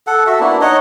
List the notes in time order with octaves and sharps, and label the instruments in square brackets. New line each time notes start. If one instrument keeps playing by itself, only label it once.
[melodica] A4 F#5
F#4 A4 E5
A#3 B3 D4 E4
D#4 C#5 D#5 F#5